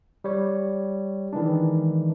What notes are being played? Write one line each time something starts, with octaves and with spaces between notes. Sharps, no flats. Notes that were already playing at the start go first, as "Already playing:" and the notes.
G3 C#5
D#3 E3 G#3 D4